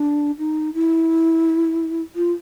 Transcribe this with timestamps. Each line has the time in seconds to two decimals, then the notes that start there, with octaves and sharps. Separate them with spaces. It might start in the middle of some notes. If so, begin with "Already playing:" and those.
Already playing: D4
0.38 D#4
0.74 E4
2.16 F4